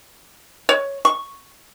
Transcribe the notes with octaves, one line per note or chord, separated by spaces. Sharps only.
C#5
C#6